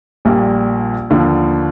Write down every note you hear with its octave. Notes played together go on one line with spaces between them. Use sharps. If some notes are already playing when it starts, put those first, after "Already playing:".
A#1 A#2 G3
D#2 D3 F3